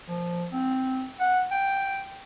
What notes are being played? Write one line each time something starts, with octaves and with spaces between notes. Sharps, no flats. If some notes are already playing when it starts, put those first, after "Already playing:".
F3
C4
F#5
G5